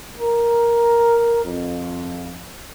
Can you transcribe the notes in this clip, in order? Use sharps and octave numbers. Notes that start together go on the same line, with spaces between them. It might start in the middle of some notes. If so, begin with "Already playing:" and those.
A#4
F2